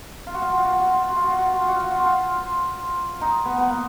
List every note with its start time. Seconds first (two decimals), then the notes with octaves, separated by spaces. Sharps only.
0.27 F4
0.34 F#4
0.42 F4
0.50 F#4
0.57 F4
0.65 F#4
0.72 F4
0.79 F#4
0.87 F4
0.94 F#4
1.01 F4
1.09 F#4
1.16 F4
1.24 F#4
1.31 F4
1.38 F#4
1.46 F4
1.53 F#4
1.61 F4
1.68 F#4
1.76 F4
1.83 F#4
1.91 F4
1.98 F#4
2.06 F4
3.21 D#4
3.46 B3
3.58 B3
3.70 A#3